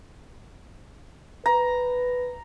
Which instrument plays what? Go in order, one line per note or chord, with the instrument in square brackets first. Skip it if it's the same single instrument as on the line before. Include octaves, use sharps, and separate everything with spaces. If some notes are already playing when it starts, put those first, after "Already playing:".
[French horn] B4 [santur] A#5